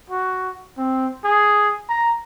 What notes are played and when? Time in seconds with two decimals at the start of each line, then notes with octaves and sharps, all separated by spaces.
0.10 F#4
0.77 C4
1.24 G#4
1.89 A#5